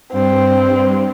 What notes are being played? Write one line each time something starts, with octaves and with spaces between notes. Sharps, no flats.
G2 C4